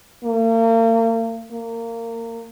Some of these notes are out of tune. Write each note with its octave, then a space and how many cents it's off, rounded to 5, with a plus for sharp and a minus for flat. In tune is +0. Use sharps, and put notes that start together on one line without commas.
A#3 -40
A#3 -25